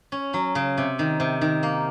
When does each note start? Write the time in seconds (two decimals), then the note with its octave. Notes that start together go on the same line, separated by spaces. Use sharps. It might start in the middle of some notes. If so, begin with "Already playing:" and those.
0.12 C#4
0.34 F#3
0.55 C#3
0.78 C3
0.99 D#3
1.20 C3
1.41 D#3
1.63 A#3